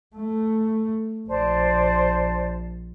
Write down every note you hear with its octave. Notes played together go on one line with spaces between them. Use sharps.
A3
A#1 C5 D5 A5